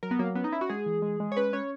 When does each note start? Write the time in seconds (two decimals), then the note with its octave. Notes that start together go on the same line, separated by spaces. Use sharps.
0.03 F#3 A#4
0.11 B3
0.19 F#3 A#3
0.35 B3 C#4
0.44 D#4
0.52 C#4 E4
0.61 F#4
0.69 G#3 G#4
0.86 E3
1.02 G#3
1.20 G#3
1.32 C#5
1.37 C#4 B4
1.53 C#4 C#5